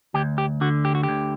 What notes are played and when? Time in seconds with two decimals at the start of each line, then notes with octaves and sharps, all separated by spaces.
0.14 D2 G4
0.38 G4
0.61 D3 F#4
0.85 G4
0.95 F#4
1.03 G4
1.09 D2